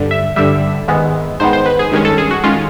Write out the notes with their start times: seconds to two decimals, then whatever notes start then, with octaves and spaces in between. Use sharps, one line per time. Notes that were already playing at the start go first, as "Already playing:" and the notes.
Already playing: G2 D3 G3
0.11 E5
0.36 G2 D3 G3 E5
0.88 G#2 D#3 G#3 B3
1.40 G#2 D#3 G#3 B3 C5
1.53 C5
1.66 B4
1.79 G#4
1.91 G2 D#3 G#3 C#4
2.05 A4
2.18 G#4
2.31 F#4
2.44 D#3 G#3 C#4 F4